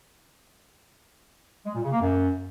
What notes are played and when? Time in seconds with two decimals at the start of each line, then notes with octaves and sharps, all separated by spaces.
1.66 G#3
1.75 A#2
1.83 C#3
1.92 A#3
2.01 F#2